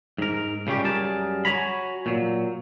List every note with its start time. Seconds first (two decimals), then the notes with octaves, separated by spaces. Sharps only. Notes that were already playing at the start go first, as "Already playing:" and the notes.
0.18 G#2 A#4
0.67 C#2 C#3 G3 C#4 G4
0.84 F#2 G3 G#4 A#4 A5
1.45 F#4 C#5 G#5 A#5 B5
2.06 A#2 F#3